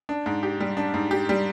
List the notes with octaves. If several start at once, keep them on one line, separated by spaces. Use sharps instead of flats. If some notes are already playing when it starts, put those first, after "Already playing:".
D4
G#2
G4
G3
D4
G#2
G4
G3